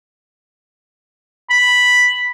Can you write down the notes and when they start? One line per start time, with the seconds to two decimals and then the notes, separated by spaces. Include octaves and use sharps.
1.50 B5